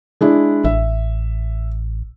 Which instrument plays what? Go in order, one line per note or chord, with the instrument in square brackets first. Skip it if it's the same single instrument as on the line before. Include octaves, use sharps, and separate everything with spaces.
[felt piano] G#3 D4 E4
[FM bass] A1 [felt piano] E5